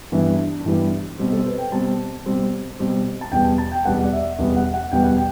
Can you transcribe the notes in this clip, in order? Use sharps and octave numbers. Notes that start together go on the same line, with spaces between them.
G2 E3 G3 B3 E4
D4
D4
G2 E3 G3 B3 E4
B2 G3 C4
A4
C5
B4
G5
B2 G3 C4 A5
B2 G3 C4
B2 G3 C4
A5
E2 B2 G3 B3 G5
A5
G5
E2 B2 G3 B3 F#5
D5
E5
E2 B2 G3 B3
F#5
F#5
E2 B2 G3 B3 G5
F#5
G5